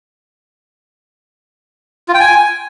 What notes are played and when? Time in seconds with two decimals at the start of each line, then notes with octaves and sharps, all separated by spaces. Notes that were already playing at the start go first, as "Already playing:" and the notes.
2.08 F4
2.14 G5
2.20 G#5